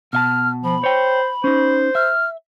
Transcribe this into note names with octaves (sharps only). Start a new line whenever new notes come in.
B2 E5 A5 F6
F3 B5
C5 C#5 G5
C#4 D#4 C5
E5 F6